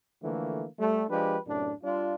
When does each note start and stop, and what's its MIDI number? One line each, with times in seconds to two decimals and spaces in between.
0.23 0.65 50
0.23 0.65 52
0.23 0.65 53
0.23 0.65 57
0.23 0.65 58
0.79 1.03 55
0.79 1.03 57
1.10 1.36 53
1.10 1.36 56
1.10 1.36 62
1.10 1.36 67
1.10 1.36 71
1.46 1.72 42
1.46 1.72 45
1.46 1.72 48
1.46 1.72 62
1.83 2.15 55
1.83 2.15 62
1.83 2.15 65